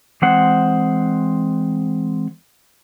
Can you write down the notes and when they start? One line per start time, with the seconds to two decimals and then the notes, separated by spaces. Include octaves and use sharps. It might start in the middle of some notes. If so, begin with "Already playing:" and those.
0.22 E3 G#3 C4 C5 F#5